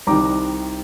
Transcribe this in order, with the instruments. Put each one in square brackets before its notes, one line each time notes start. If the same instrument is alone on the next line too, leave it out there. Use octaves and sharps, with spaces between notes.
[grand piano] C2 C3 D#3 G3 A#5 D6